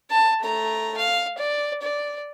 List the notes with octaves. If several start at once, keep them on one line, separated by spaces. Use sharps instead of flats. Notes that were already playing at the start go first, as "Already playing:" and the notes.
A5
A3 A#5
F5
D5
D5